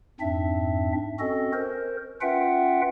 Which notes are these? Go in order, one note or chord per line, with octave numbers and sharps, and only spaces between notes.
F2 G#2 C4 D4 E5
C4 C#4 F#4 A4 D#5
A#4 C5
C#4 F4 B4 E5 F#5 G5